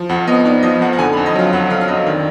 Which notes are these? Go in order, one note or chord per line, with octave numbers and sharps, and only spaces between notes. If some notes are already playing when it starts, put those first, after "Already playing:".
Already playing: F3
F2 F#5
B3 D#5
D#4 D5
F3 D#5
F2 F#5
F#5
D3 G#5
B5
F2
D#5
F#3 F5
F2 F#5
D3 F5
F5
F2 D#5
D#3 D5